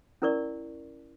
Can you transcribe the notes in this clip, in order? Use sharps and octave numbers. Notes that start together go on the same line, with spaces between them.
C#4 E4 A#4 D5 C#6